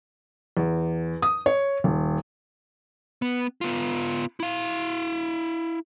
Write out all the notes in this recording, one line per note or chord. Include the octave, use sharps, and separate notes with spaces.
E2
D#6
C#5
D#1
B3
B3 F4
E4 F5